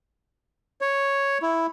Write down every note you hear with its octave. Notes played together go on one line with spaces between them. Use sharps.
C#5
E4